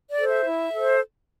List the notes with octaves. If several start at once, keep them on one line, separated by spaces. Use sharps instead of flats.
D5
A4 C5
E5
E4
A4 C5